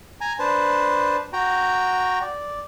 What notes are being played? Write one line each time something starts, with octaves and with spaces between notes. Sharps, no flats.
G#5 A#5
D4 B4 C5 A5
F#4 G5 A#5
D5